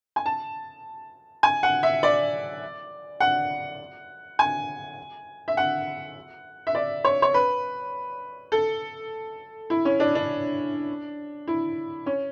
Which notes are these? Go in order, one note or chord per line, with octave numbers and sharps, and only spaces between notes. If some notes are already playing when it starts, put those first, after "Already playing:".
G#5
A5
G#5
F#5
E5
D5
F#5
G#5
E5
F#5
E5
D5
C#5
C#5
B4
A4
E4
C#4
D4
D4
E4
C#4